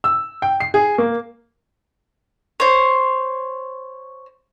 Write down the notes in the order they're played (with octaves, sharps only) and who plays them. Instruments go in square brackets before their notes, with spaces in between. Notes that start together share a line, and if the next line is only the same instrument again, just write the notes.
[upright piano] E6
G5
C7
G#4
A#3
[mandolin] C5 C#5